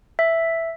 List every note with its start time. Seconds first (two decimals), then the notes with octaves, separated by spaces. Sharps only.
0.19 E5